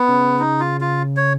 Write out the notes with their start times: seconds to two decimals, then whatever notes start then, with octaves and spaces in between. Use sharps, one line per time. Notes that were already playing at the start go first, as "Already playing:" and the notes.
Already playing: B3
0.09 C#3
0.39 D#4
0.60 F4
0.81 F4
1.17 C#5